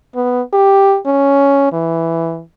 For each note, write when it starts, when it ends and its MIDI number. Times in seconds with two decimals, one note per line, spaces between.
0.15 0.41 59
0.53 0.97 67
1.06 1.71 61
1.73 2.41 52